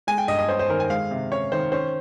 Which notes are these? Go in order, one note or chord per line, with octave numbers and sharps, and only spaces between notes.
G#3 G#5
G5
G2 D#5
D#5
C#4 C5
C5
D#3 A#4
G#5
G#3 F5
C3
C#4 C#5
D#3 C5
C#4 C5